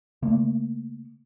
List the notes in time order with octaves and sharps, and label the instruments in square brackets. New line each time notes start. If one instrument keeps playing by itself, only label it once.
[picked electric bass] C#3 A3 A#3